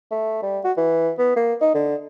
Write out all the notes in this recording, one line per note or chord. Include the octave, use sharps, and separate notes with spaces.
A3
G3
F#4
E3
B3
A#3
D#4
D3